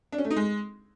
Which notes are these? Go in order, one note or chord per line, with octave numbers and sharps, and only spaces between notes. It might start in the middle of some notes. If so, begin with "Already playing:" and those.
D4
C#4
A3
D#4
G#3